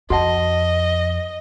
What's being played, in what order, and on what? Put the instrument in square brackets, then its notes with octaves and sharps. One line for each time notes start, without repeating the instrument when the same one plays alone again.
[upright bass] F2 [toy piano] F#4 F#5 A5 [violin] D#5